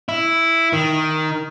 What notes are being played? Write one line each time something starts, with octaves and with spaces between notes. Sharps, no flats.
E4
D#3